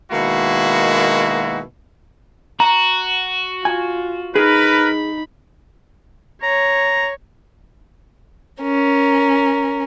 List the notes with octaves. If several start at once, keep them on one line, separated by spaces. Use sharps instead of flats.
B2 D#3 G#3 A#3 E4 F#4
F#4 A#5
F4 G#5
D#4 G#4 A#4 B4 B5
C#5 A#5
C#4 A#4